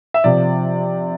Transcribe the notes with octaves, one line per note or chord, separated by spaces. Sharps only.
E5
C3 F3 D5